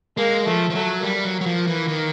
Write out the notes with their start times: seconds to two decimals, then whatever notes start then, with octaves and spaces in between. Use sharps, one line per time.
0.17 G#3 A#3
0.46 F3 A3
0.70 F3
0.74 F#3 A3
1.03 G3 A#3
1.25 F#3
1.41 F#3
1.46 F3
1.67 E3
1.88 D#3